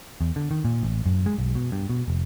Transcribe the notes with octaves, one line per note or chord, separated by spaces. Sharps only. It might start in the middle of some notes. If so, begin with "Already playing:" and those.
E2
D3
D#3
A#2
A1
F#2
G#3
B1
B2
G2
B2
F1